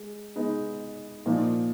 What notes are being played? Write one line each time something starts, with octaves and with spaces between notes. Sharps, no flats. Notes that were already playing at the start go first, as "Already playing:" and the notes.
Already playing: G#3
G#3 B3 D#4
A#2 F3 A#3 D#4